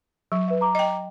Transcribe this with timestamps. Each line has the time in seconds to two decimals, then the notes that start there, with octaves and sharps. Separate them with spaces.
0.32 F#3 C#6
0.48 B4 E5
0.61 A#5 D6
0.75 D#5 G5